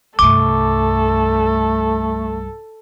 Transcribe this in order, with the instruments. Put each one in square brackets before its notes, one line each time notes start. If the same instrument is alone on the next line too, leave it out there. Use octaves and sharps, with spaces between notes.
[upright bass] C2 G2 [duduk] A3 [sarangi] A4 [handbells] D6